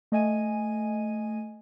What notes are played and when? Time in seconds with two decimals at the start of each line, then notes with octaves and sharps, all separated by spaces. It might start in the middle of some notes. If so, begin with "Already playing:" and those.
0.12 A3 D#5 G#5 D#7